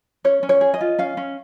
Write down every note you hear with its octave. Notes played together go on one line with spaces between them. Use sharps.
C#4 C#5
C#4
C#5
G#4
D#5
F4
C#4 F5
C#4